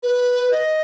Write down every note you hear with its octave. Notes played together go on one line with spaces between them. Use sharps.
B4
D#5